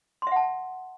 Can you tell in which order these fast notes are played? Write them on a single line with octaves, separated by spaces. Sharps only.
C6 E5 F#5 A5